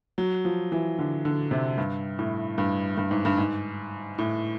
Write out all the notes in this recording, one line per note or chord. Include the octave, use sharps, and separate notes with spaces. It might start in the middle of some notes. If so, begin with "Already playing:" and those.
F#3
F3
E3
D3
D3
C3
G2
A2
G2
G2
G#2
G2
G#2
A2